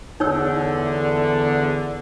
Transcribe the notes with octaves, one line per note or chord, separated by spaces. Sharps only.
E2 D3 D#4 C#5 E6